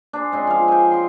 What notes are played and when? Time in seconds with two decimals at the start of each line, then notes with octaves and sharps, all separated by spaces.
0.13 D4 G#4 C5
0.32 C#3 G#3 C4
0.47 F3 F5
0.68 G5 G#5
0.91 D#5 C6